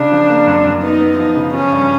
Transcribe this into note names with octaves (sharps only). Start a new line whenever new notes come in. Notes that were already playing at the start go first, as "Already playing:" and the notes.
Already playing: C#3 D4
F3
A#3
F#2
F#2
B3 D#4
B3
F3 D#4
C#3
F3 C#4
G2